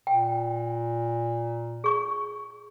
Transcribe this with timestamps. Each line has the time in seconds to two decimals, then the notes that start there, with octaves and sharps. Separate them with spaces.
0.07 A#2 G5
1.84 G#4 C#6